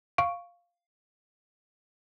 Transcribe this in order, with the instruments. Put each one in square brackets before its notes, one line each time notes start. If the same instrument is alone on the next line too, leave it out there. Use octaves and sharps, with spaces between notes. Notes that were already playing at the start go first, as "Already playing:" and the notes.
[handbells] F5 C#6 D7